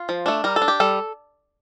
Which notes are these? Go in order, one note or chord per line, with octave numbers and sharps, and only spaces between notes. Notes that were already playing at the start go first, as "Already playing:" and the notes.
Already playing: F4
F3
A3 D4
G3 A#4
A4
D4
G4
G3 A4